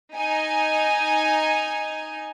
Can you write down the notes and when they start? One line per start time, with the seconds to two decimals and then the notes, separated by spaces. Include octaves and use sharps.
0.15 D#4 G#5